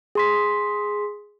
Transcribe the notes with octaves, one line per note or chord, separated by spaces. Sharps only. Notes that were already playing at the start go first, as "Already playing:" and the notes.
G#4 C6 B6